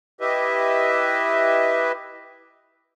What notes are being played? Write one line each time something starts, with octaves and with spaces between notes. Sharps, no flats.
E4 G4 B4 D#5 E5